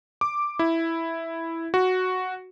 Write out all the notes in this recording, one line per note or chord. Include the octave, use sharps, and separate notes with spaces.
D6
E4
F#4